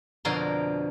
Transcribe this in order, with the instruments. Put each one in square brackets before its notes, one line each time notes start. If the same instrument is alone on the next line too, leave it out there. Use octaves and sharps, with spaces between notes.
[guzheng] F2 B2 D3 A#4 F5 C6